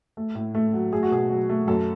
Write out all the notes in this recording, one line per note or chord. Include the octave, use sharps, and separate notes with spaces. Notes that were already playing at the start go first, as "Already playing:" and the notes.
A3
A2
A3
F#3
A3 G#4
F#4
B2 G#4
F#3
A3
F#2 A4